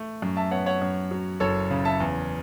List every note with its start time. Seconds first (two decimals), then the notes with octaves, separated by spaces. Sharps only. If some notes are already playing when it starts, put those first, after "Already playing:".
Already playing: A3
0.22 F#2
0.37 E5 A5
0.51 B3 C#5 F#5
0.66 C#5 F#5
0.82 F#2
1.11 F#3
1.40 F#1 A4 C#5
1.71 C#3
1.85 E5 A5
2.00 E2